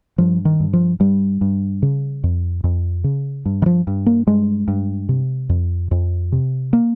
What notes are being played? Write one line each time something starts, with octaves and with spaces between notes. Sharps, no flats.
G2 F3
D#3
G2
F3
G2 G3
G2
C#3
F2
F2
C#3
G2
D#3
F3
G2
A#3
G2 G#3
G2
C3
F2
F2
C3
A#3